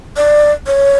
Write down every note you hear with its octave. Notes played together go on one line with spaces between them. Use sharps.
D5
C#5